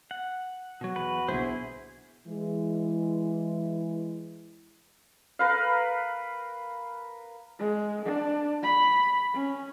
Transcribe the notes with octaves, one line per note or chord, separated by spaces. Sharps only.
F#5
B2 F#3 F#4
E2 B4
B1 D4 E4 G#4 C5
E3 G#3
A#4 B4 F5
G#3
D4
B5
C#4